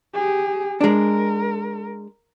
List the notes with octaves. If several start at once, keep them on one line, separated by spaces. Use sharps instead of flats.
G4 G#4
G#3 D4 A#4